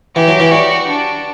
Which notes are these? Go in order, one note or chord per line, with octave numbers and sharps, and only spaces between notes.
E3 G4
F#3
E3
G3 F#4
D4